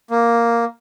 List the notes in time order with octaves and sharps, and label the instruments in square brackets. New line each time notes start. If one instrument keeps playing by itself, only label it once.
[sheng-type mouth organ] A#3